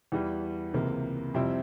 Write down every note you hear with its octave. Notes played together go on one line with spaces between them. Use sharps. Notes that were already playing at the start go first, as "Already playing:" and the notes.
E2 E3 G3
C#2 C3 E3 A#3
F2 C3 G3 C4 E4